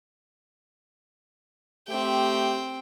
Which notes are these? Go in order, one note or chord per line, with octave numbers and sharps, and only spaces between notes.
A3 C4 G4 G5